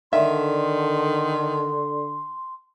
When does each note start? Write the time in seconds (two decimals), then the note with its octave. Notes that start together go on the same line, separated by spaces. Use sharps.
0.13 D3 D#3 E5 C6